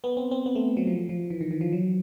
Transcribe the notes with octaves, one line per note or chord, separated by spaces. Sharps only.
B3
C4
C4
B3
A3
F#3
F3
F3
E3
D#3
E3
F3
F#3